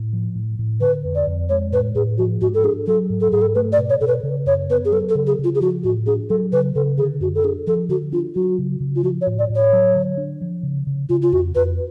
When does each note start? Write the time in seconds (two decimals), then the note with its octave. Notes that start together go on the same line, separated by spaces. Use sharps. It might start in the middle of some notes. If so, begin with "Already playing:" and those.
Already playing: A2
0.13 F3
0.35 A2
0.59 A2
0.81 D3 B4
1.05 F2
1.15 D5
1.27 F2
1.49 G#3 C#5
1.72 A2 B4
1.95 A2 G#4
2.18 F3 F#4
2.41 G#2 F#4
2.54 A4
2.64 D4 G#4
2.86 F#3 A4
3.10 G#2
3.20 A4
3.31 G#2 G#4
3.41 A4
3.55 A3 B4
3.72 D5
3.78 B2
3.89 C#5
4.01 B2 A4
4.07 B4
4.23 C#3
4.46 F#2 C#5
4.70 B3 B4
4.85 G#4
4.92 F#3 A4
5.09 A4
5.15 C#3
5.27 G#4
5.39 C#3
5.44 F4
5.55 G#4
5.61 F3 F#4
5.84 A2 F#4
6.06 D4 G#4
6.29 F#3 A4
6.52 C#3 B4
6.75 C#3 A4
6.98 D3 G#4
7.20 F#2 F#4
7.35 A4
7.44 D4 G#4
7.67 F3 A4
7.89 D3 F#4
8.12 D4 F4
8.35 F#3 F#4
8.59 C#3
8.80 C#3
8.96 F4
9.03 F3 F#4
9.21 C#5
9.27 A2
9.39 D5
9.50 A2
9.55 C#5
9.73 F#3
9.95 D3
10.17 D4
10.41 F3
10.63 C#3
10.87 C#3
11.09 C#3 F4
11.22 F4
11.32 F2 F#4
11.55 F2 B4